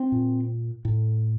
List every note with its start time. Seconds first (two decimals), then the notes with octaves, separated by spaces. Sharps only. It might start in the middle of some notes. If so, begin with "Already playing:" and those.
Already playing: C4
0.12 A#2
0.85 A2